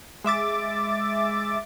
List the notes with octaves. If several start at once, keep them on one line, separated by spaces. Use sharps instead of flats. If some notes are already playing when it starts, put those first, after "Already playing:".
G#3 E5 D6 A6